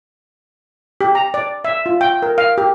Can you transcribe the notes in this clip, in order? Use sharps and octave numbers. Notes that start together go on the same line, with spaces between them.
G4
A#5
D5
E5
F4
G5
A#4
F5
G4